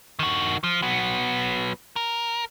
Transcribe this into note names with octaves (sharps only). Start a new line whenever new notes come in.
D#3 F#4
F3
F#3 B3
A#4